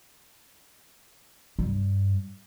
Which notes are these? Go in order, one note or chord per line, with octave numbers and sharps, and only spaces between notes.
G2